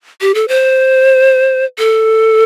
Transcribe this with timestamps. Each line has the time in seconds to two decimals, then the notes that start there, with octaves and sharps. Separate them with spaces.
0.21 G4
0.35 A4
0.48 C5
1.78 A4